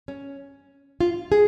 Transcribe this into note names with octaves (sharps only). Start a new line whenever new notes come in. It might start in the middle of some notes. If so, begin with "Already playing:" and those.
C#4
F4
G#4